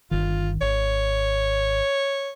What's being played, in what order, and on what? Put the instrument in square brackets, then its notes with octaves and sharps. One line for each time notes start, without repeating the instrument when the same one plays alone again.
[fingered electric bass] G1 D#3 [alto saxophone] F4
[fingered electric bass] G#1 [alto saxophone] C#5